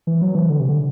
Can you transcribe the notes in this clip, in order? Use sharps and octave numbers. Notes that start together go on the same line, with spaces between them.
E3
F#3
E3
D3
C3
D3